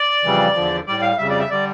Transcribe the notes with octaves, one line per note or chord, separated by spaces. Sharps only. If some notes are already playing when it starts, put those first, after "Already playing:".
Already playing: D5
F2 C#3 E3 G3
E2 D3 F3
A2 G3 D5
F5
F2 C#3 G3 E5
D5
E5
D3 G3 D5